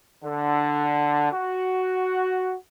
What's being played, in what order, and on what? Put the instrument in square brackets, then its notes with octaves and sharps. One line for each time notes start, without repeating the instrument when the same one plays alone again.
[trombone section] D3
F#4